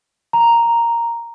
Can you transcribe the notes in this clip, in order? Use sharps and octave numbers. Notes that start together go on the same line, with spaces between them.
A#5